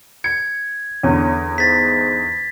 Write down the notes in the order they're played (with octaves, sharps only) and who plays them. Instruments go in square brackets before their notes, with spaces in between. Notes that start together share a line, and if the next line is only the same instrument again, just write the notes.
[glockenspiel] G#6 [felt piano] C#7
[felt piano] E2 D3 [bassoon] C#4
[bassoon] G#2 [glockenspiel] A6 B6